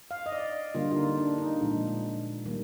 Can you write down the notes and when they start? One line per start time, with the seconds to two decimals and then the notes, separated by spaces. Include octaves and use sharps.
0.11 F5
0.26 D#5
0.32 D5
0.74 D3 G3 A#3 F4
0.91 F4
0.96 D#4
1.17 D4
1.38 D#4
1.60 A#2 F3 G#3
2.45 D#3 G3 A#3